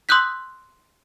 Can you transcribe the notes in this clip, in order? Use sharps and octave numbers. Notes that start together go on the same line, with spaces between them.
C6 D#6 E6 F#6 G6 B6